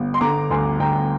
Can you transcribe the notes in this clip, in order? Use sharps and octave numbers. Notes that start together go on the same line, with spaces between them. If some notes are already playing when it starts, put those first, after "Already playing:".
Already playing: G1
C6
D3 A#5 D6
D2 G#5 C6
D2 G5 A#5